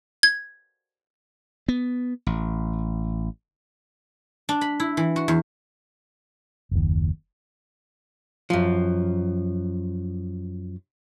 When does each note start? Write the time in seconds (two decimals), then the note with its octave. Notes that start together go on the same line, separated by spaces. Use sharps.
0.23 G#6
1.68 B3
2.27 A1
4.49 D4
4.61 B5
4.80 E4
4.97 E3
5.16 F#4
5.28 E2
6.71 F#1 D#2
8.50 F#2 F3